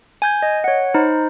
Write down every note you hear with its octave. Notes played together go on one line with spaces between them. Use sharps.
G#5 G6 G#6
D#5
C#5 F#5
D#4 C5 B5